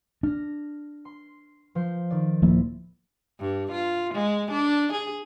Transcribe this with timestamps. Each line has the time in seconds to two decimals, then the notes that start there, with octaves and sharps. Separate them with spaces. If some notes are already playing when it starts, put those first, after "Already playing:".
0.23 D4 F6 A#6
1.05 C6
1.75 F3 C5
2.10 D#3 D5
2.42 D1 F3 A#3 E4
3.40 G2
3.71 F4
4.13 G#3
4.51 D4
4.92 G#4